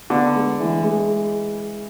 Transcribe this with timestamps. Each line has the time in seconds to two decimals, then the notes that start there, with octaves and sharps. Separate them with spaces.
0.10 D3 B3
0.35 G#3
0.60 E3
0.83 G#3